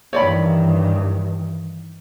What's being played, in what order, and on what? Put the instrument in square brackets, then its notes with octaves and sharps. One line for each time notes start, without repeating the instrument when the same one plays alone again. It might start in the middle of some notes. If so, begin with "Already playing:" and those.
[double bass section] G2 D#3 E3 [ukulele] C#5 D5 B5